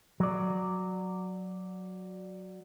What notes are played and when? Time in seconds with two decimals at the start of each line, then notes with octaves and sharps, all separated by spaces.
0.20 F#3 D5